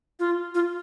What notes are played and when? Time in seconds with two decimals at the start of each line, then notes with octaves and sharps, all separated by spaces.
0.20 F4
0.55 F4